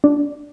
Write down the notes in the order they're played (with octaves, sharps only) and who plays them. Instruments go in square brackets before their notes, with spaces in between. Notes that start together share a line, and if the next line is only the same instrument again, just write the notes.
[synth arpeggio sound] D4